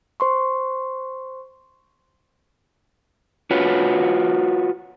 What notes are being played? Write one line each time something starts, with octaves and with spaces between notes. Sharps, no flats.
C5 C6 C#6
F4 F#4 B4 C#5